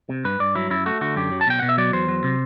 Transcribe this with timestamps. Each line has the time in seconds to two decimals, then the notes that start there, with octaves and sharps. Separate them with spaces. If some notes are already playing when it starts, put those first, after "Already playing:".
0.09 C3
0.24 G2 B4
0.39 G2 D5
0.55 F#3 E4
0.70 F#2 E4
0.86 A3 F#4
1.01 D3 F#4
1.16 F#2 G4
1.32 F#3
1.41 A5
1.47 B2 G5
1.60 B2 F#5
1.69 E5
1.78 F#3 D5
1.93 E2 C5
2.08 F#3
2.24 C3